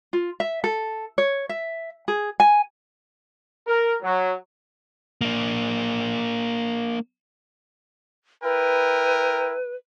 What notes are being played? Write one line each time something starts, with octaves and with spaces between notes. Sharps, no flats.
F4
E5
A4
C#5
E5
G#4
G#5
A#4
F#3
A#3 D4
E4 A#4 B4 G5